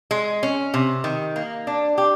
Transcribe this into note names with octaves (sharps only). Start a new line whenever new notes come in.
G#3
C#4
C3
D#3
A#3
D4
G4